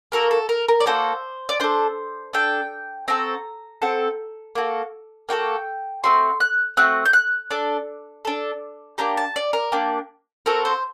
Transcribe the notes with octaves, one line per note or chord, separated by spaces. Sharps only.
A#3 F#4 A4 A#4
A4
A#4
A#4
D5
A#3 F#4 A4 C5
D5
D4 A4 C5
D4 A4 G5
C4 F#4 A4 A#5
C4 F#4 A4
A#3 F#4 A4
A#3 F#4 A4 G5
A3 C4 F#4 C6
F#6
A3 C4 F#4 F#6
G6
F#6
D4 A4
D4 A4
A#3 D4 G4 A#5
A5
D5
A#4
A#3 D4 G4
C4 F#4 A4 A#4
C5